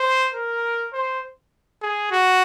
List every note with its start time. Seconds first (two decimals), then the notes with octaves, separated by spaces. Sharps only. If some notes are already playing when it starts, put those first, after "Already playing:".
Already playing: C5
0.34 A#4
0.93 C5
1.82 G#4
2.11 F#4